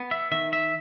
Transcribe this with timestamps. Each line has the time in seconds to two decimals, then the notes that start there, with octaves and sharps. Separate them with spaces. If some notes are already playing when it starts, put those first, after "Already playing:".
Already playing: B3
0.11 E5
0.32 D#3 E5
0.53 E5